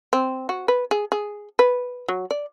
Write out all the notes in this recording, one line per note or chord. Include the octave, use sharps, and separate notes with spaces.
C4
F#4
B4
G#4
G#4
B4
F#3
D5